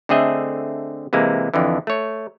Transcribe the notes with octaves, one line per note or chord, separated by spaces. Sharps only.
D3 A3 C4 G#4 D#5 E5
C3 E3 G#3 A#3
F2 D3 E3
A3 C#5